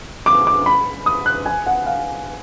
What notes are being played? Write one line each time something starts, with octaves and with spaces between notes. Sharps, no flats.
D6
D6
B5
D#6
F#6
G#5
F#5
F5